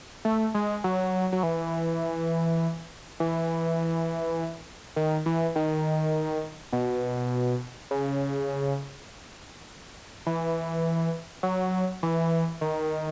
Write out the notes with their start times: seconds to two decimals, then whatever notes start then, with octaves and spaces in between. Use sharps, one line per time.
0.25 A3
0.54 G#3
0.84 F#3
1.32 F#3
1.43 E3
3.20 E3
4.96 D#3
5.26 E3
5.56 D#3
6.72 B2
7.91 C#3
10.26 E3
11.43 F#3
12.03 E3
12.61 D#3